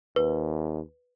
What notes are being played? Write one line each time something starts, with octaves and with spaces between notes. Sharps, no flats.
D#2 B4